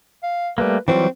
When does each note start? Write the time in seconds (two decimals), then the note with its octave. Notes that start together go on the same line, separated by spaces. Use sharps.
0.23 F5
0.58 G3 A3 A#3 B4
0.88 E3 F#3 G3 C4 F4